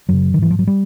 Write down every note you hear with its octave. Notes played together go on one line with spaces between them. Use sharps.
F#2 C#3 F#3
D#3
G#2 E3
F3
F#3
G3